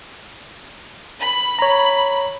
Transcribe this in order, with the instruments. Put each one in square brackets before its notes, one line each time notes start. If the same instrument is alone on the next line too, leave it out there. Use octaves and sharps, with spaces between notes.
[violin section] B5
[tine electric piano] C#5 A#5